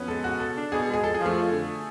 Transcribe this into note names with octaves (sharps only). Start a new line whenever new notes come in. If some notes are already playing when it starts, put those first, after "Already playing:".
Already playing: F2 B3 C#4
G#3 A4
C#3 F#4
B2 A4
D4
B2 G#4
G#3
G#4
F2 A4
G#4
F3
A3
F2
D3